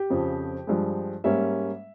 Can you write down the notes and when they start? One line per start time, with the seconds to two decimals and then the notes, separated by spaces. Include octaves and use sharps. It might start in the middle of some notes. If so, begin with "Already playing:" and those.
Already playing: G4
0.10 F2 C#3 F3
0.67 G2 F3 G#3
1.24 G#2 G3 A#3 C#4 E5